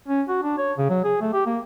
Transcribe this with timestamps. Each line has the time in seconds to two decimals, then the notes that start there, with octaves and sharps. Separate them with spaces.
0.08 C#4
0.29 F#4
0.43 D4
0.58 C#5
0.78 C#3
0.90 F#3
1.04 G#4
1.21 A3
1.33 G4
1.46 A#3